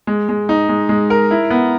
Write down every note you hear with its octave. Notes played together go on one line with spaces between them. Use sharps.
G#3
G#3
D#4
G#3
G#3
A#4
E4
B3